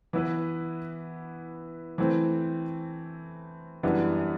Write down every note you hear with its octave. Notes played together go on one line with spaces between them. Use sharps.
E3 B3 E4 B4
E3 A3 C4
F#2 E3 G3 B3 D4